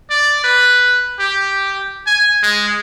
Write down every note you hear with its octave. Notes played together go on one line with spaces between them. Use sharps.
D5
B4
G4
G#5
G#3